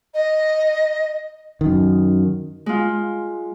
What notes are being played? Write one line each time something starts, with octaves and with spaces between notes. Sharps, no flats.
D#5
F#2 D#3
G#3 F4